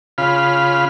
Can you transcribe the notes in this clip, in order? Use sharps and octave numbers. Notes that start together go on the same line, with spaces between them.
C#3 F4 B5 F6